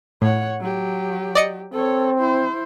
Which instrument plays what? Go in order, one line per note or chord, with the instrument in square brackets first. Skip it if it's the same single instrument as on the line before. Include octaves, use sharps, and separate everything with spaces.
[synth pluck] A2 [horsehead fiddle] C#5 F#5
[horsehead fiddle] F#3 G4
[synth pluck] D5 D#5 C#7
[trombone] C4 [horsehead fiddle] A4 C#5
[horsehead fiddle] E4 C5